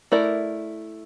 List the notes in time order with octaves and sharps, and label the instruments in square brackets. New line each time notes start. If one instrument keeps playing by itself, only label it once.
[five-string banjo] A3 E4 A#4 D5